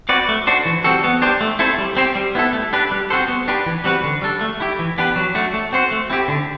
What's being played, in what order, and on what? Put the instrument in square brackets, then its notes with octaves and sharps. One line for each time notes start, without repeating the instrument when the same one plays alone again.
[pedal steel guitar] C4 F#4 B4 D5
A3
D4 F#4 C5
E3
G3 C4 F#4 A4
B3
D4 G4 C5
A3
C4 E4 A4 C5
G3
C4 G4 C5
G3
B3 E4 A4
A3
D4 G4 B4
G3
C4 F#4 A4 C5
B3
D4 G4 B4
E3
G3 C4 F#4 B4
D3
G3 D4 A4
A3
E4 G4
E3
B3 D4 G4 B4
F#3
A3 D4 F#4
A3
C4 F#4 C5
A3
C4 E4 G4
D3